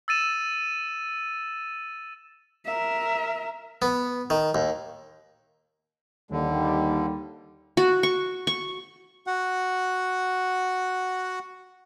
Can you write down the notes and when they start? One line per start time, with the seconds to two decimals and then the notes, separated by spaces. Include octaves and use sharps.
0.08 E6 A6 D#7 E7
2.66 A#4 E5
3.82 B3
4.30 D#3
4.55 D#2
6.31 D#2 D3 G3
7.77 F#4
8.03 C#6
8.47 C#6
9.27 F#4 F#5